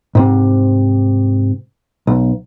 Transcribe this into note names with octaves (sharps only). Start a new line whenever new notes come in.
G#2 C3
B1